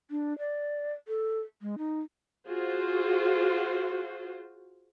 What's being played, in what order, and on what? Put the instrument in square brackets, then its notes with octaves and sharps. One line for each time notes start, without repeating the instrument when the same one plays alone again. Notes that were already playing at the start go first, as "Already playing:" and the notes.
[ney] D4
D5
A4
G#3
D#4
[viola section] F4 F#4 G#4 C5